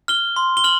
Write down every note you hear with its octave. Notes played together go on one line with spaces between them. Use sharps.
F6 G7
C6
G7
F6 F#7